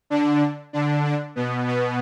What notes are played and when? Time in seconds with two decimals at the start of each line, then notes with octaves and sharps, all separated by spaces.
0.10 D3 D4
0.73 D3 D4
1.05 D3 D4
1.36 B2 B3
1.67 B2 B3